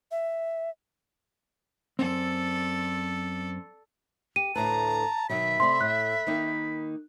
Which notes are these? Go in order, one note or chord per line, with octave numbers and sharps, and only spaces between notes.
E5
F#2 C4 A4 D5
G4 D#7
D2 A2 B4 A5 A#5
B2 D#3 F#3 E5 B5
C3 A3 D5 C6
A2 F#6
D#3 A#3 D#4